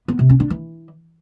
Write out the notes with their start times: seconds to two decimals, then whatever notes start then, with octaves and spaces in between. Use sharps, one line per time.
0.08 B3
0.19 C3
0.29 C#4
0.40 D4
0.50 E3